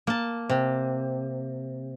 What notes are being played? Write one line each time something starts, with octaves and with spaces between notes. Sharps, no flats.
A#3 A5
C3